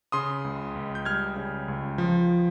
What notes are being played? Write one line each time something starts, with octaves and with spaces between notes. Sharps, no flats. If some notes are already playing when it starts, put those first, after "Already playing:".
C#3 C6 D#6
C#2
C#2
G6
G3 F6 G#6
C#3
C#2
F3